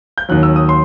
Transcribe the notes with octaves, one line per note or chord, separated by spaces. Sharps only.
G6
D#2 D#3 F#3 F#6
E6
D#6
C6